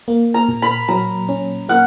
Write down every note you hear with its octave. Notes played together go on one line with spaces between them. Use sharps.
A#3
A#5
A#2
B5
F#3 A#5
C#4
A#3 F#5